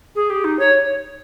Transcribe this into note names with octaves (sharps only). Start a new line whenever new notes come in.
G#4
G4
D#4
C#5